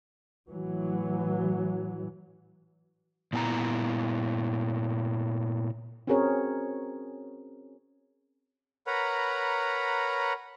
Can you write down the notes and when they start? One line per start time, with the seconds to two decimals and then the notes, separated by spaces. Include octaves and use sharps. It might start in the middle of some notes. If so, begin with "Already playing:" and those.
0.49 A2 E3 F#3
3.33 A#2 B3 E4 G#5 A#5
6.07 C4 C#4 F#4 G#4 A#4 C#5
8.87 A#4 B4 C#5 F#5 A#5 B5